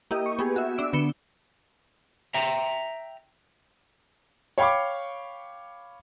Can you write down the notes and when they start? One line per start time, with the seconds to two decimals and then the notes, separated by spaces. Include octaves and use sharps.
0.11 A#3 E4 G4 D#5
0.26 C#6
0.39 B3 G4 G#4
0.56 F#4 E5
0.78 D4 E6 D7
0.93 D3 B3 C#7 E7 G7
2.34 E5 G5 A#5
4.58 C#5 F5 G5 B5 C#6 D6